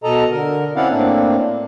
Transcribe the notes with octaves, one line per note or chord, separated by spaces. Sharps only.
B2 A4 D#5 A#5
D3 A#4
C4 C#4 E4 D5 F5 F#5
A2 A#3 C4 D4